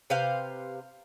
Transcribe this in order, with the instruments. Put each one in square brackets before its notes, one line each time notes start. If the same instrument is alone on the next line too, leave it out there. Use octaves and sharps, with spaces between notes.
[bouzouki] C3 B4 C5 F5